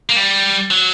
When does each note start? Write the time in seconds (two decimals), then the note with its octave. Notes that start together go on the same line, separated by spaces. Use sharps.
0.10 A#3
0.16 G3
0.71 F#3